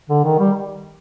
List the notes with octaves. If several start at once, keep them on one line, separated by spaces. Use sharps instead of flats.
D3
D#3
G3